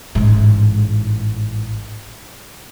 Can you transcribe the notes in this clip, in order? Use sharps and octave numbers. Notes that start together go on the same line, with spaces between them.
A1 G#2